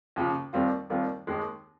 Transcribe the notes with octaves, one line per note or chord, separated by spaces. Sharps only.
D#2 C#3 F3
D#2 D#3 G3 C4 F4
D#2 D#3 G3 C4 F4
D#2 D#3 G#3